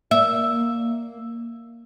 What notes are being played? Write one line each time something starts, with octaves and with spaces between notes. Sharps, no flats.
A#3 E5